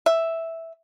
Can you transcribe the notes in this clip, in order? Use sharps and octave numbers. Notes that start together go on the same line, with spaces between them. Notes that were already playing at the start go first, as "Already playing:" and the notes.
E5